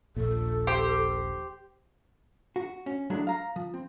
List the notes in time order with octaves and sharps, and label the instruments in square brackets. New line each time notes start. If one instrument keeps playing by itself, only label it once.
[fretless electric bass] D#1 A#1 A#2 [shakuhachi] A4
[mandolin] G4 C5
[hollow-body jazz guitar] F#4
C#4
F#3 G#3 A3 D4 E4
F5 A#5
F3
C4